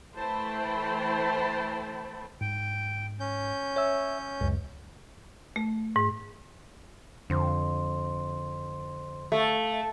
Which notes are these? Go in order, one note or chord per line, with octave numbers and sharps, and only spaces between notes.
E3 A3 C5 G5 A5 B5
G#2 G5
C#4 G6
C#5 E5 E6
C#2 F#2
A3
G#2
F2 D3 C5 C6
A3 F5